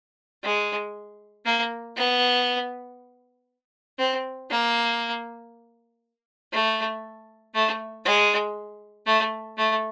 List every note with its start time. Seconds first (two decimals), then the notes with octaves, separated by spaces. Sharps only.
0.43 G#3
1.45 A#3
1.96 B3
3.99 C4
4.50 A#3
6.52 A3
7.54 A3
8.04 G#3
9.06 A3
9.57 A3